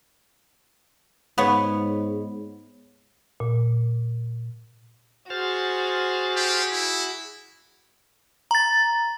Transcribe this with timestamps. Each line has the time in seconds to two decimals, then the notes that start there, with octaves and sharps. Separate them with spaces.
1.38 G#2 B3 B4 C#5
3.40 A#2
5.30 F#4 G#4 C5 F6 A6
6.36 G4
6.72 E4
8.51 A#5 A6